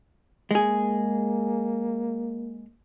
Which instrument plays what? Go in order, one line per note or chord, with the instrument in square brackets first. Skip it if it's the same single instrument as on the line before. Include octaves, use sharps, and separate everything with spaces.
[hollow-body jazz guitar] G#3 G#4 [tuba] A#3